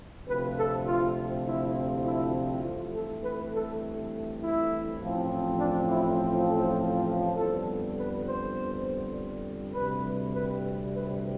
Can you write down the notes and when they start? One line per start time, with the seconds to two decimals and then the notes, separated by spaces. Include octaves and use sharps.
0.25 D2 C3 F3 C4 B4
0.55 A4
0.84 F4
1.44 E4
2.03 E4
2.62 G2 E3 A3 C4 F4
2.92 A4
3.22 B4
3.51 A4
4.40 E4
4.99 A1 A2 F3 C4
5.59 D4
5.89 E4
6.18 F4
6.49 A4
7.36 F2 D3 G3 B3 A4
7.96 B4
8.26 C5
9.74 D2 C3 G3 C4 B4
10.33 B4
10.93 B4